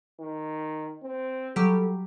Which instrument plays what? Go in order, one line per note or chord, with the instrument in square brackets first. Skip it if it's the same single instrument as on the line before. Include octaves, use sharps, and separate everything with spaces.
[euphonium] D#3
C4
[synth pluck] F#3 G3 G4 [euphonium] A4